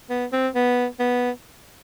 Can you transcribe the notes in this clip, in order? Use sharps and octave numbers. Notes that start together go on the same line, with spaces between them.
B3
C4
B3
B3